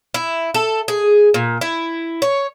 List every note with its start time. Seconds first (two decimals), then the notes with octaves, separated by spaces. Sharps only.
0.14 E4
0.54 A4
0.88 G#4
1.34 A#2
1.61 E4
2.22 C#5